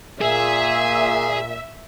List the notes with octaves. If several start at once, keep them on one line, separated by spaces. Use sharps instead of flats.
A#2 G#4 E5